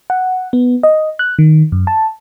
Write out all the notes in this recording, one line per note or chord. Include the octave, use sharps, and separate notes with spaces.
F#5
B3
D#5
F#6
D#3
F#2
A5